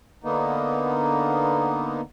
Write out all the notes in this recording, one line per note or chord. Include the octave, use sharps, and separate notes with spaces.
D3 A#3 B3 D#4